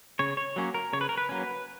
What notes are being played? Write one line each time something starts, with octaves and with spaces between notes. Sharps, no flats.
C#3 C#5
C#5
F#3 A#3 C#4
A#4
C#3 C#5
B4
A#4
B4
F#3 A#3 C#4